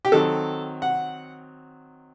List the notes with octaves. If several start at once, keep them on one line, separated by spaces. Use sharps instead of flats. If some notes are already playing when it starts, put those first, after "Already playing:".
G4
D#3 F#3 C4 A4
F#5